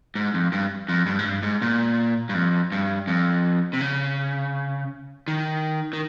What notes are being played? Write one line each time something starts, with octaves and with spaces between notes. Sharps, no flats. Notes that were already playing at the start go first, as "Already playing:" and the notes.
G#2
F2
G2
F2
G2
G#2
G2
G#2
A#2
G2
F2
G2
F2
C3
C#3
D#3
D#3